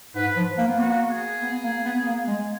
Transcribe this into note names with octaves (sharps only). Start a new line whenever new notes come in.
G#2 B4
F3
A#3
B3
A#3 F#4
G#4
B3
A#3
B3
A#3
G#3